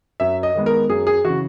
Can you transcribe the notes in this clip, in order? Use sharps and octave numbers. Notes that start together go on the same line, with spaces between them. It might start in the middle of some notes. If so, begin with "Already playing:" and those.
F#2 E5
D#5
D#3 G#3 B3
A#4
F#2 G#4
G#4
C#3 E3 F#4